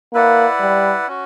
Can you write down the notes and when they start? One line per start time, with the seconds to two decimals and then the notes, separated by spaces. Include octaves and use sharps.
0.14 A#3 E4 B4 D5 F#5
0.60 G3
1.08 C#4 F#4